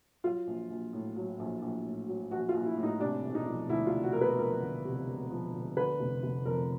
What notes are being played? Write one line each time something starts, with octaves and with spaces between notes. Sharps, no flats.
F#3 F4
A#1
A#1
A2
F#3
A#1
A#1
A2
F#3
A#1 F#4
F4
A#1
E4
A2
D#4
C3 D4
E1
D#4
F3
D2 E4
F4
C3
F#4
E1 A#4
B4
F3 A#4
D2
C3
E1
F3
D2
D3 B4
F1
F1
F2 A#4